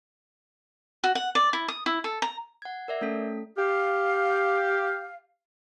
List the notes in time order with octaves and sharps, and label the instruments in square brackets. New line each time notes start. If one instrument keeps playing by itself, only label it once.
[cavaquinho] F#4
F#5
D5
E4
D#6
E4
A4
A#5
[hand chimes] F#5 G#6
A#4 D5 E5
A3 C#4 A4 B6
[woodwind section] G4 F5